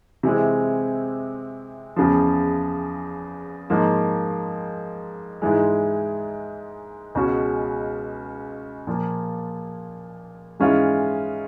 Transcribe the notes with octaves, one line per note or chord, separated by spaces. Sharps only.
C3 E3 G#3 C4
E2 C#3 F3
G#2 F3 A#3
G#2 E3 G#3
C#2 B2 G#3 C#4 F#4
A#2 F3 A#3
G#2 E3 G#3 C#4 F4